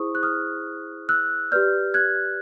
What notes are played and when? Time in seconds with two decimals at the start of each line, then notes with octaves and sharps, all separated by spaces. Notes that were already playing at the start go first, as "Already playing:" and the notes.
Already playing: E4 G#4 C5 C#6 D#6
0.15 F#6
0.23 D#6 F6
1.09 E6 F#6
1.52 G4 B4 D5 F6 G6
1.94 F#6 G#6